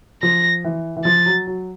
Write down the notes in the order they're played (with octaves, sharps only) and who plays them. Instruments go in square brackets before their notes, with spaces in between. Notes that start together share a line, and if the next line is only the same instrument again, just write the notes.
[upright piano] F3 [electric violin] A#6
[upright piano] E3
E3
[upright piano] F3 [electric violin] A6
[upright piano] F#3
F#3